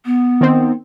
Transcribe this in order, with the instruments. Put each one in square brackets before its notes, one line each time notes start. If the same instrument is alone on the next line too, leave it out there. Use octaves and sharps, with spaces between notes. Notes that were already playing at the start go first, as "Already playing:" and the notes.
[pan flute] B3
[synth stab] D#3 C4